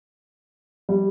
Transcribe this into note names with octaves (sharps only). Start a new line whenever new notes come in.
G3